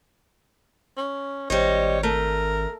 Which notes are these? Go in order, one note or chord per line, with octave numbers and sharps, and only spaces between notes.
C#4
G#1 G3 C5 C#5 D#5
A3 A#4